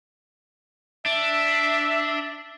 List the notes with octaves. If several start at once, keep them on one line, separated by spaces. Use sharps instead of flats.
D4 E5